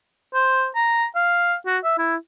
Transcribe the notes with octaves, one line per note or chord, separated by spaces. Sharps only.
C5
A#5
F5
F#4
E5
E4